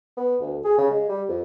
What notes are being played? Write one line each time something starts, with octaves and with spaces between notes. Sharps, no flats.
B3
D2
G#4
C#3
G#3
G3
F2